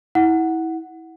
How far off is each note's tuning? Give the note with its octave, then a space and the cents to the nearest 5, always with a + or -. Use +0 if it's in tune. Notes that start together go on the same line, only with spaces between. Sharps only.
E4 -25 F#5 +0